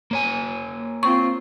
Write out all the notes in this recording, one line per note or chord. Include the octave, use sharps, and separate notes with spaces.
A#3 C#5 G#5
C4 F4 C#6